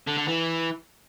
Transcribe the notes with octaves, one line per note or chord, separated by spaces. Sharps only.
D3
D3
E3